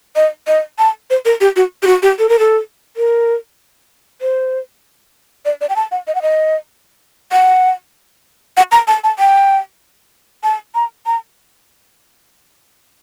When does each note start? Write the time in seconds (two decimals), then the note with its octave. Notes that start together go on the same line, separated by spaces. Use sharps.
0.16 D#5
0.47 D#5
0.79 A5
1.10 C5
1.25 A#4
1.41 G4
1.56 F#4
1.83 G4
1.87 F#4
2.02 G4
2.19 A4
2.29 A#4
2.39 A4
2.97 A#4
4.21 C5
5.45 D5
5.61 D5
5.69 G5
5.76 A5
5.92 F#5
6.07 D#5
6.15 F#5
6.22 D#5
7.32 F#5
8.57 F#5
8.72 A#5
8.88 A5
9.04 A5
9.19 G5
10.44 A5
10.75 A#5
11.06 A#5